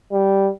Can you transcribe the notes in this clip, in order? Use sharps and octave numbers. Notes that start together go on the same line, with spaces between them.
G3